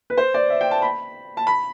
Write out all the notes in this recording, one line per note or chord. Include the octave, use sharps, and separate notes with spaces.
B4
C5
D5
E5
G5
A5
B5
A5
B5